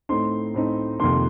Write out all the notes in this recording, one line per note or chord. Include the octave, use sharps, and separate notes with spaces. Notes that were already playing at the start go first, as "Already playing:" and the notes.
A2 A3 C4 D#4 C6
A2 A3 C4 D#4
F2 C3 D#3 A#3 C6